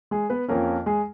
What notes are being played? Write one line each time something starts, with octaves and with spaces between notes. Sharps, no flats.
G#3 G#4
B3 B4
F2 F3 A#3 C#4 A#4
G#3 G#4